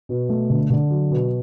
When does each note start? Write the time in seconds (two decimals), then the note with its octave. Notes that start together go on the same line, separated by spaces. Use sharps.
0.09 B2
0.29 A3
0.50 D3
0.70 D3
0.90 F#3
1.11 B2